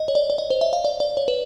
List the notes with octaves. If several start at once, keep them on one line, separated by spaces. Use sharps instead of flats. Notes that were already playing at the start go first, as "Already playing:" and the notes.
Already playing: D#5
C#5
D5
D5
D#5
C5
E5
F5
D5
D5
C#5
B4